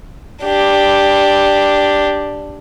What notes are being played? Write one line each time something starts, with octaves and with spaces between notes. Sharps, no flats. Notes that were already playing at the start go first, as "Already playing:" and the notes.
D4 G4